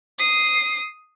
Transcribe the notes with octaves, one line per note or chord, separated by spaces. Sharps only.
D#6 C7